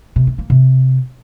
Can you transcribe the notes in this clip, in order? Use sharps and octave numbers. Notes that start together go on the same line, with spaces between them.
C3
A3
A#3
C3